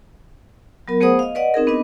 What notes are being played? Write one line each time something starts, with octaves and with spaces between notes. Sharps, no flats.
F#3 B3 A#4
A3 B3 G#4 C5 F#5 D#6
D#5 F5
B4 D5 D#5 F#5
C4 D#4 G#4 A#4
B3 D4 B4 D#5